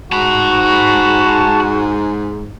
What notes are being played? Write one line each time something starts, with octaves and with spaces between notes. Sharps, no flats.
G#2 F#4 A5 B5